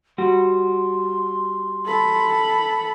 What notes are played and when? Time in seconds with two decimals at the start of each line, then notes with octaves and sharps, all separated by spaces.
0.18 G3 F#4 C6
1.86 A4 B5